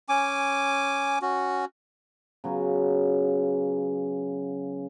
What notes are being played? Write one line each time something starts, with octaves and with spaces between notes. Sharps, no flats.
C#4 G#5 D6
C#4 F#4
C#3 F#3 B3 F4